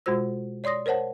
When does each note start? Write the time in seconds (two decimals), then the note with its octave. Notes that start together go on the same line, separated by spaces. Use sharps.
0.06 B2 G#3 F4 F#4 C5 E6
0.64 C#5 D5 C6 D#6 A#6
0.86 A#4 C5 C#5 F#5 A5